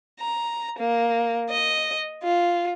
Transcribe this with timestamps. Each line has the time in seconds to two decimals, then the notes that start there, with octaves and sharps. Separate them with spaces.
0.19 A#5
0.79 A#3
1.50 D#5
2.23 F4